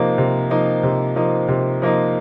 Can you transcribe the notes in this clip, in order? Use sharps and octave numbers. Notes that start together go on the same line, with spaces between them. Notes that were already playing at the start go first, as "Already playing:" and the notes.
Already playing: C3 F3 A#3 D#4
C3
F3 A#3 D#4
C3
F3 A#3 D#4
C3
F3 A#3 D#4